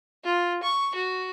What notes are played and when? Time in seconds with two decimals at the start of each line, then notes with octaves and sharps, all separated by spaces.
0.24 F4
0.63 C#6
0.95 F#4